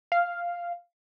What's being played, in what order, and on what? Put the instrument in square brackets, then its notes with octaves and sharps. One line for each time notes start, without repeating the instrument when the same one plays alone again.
[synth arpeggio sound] F5